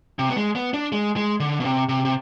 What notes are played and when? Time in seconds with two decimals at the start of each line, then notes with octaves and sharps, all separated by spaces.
0.19 C3
0.30 B3
0.37 G#3
0.56 B3
0.74 D4
0.93 G#3
1.16 G#3
1.40 D3
1.60 B2
1.65 C3
1.89 C3
2.05 C3